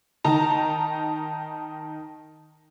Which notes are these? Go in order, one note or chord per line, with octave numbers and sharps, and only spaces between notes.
D#3 D#4 A5 A#5